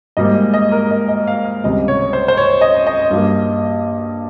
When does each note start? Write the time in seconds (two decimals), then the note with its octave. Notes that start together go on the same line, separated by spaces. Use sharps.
0.17 G#2 G3 A#3 D#5
0.54 D#5
0.72 A#4
0.91 D#5
1.09 D#5
1.27 F5
1.45 F5
1.64 C#2 C3 G3 D#5
1.88 C#5
2.13 C5
2.28 C5
2.37 C#5
2.61 D#5
2.87 D#5
3.11 G2 G3 A#3